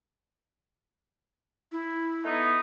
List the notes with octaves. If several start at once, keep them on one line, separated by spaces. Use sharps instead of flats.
E4
A3 B3 D#4